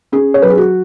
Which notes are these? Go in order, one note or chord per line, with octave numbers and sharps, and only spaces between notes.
C#4 G#4
C#5
F#3 B4
G#4
F#4